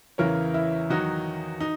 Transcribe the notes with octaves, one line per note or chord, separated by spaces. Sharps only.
E2 C#3 E3 A#4 C#5
E4
E2 D#3 F#3 D#4 F#4
D#4